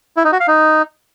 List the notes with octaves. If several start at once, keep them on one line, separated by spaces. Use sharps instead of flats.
E4
D#4
F#4
F5
D#4